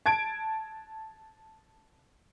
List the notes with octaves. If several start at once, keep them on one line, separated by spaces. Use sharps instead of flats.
A5 G#6 D7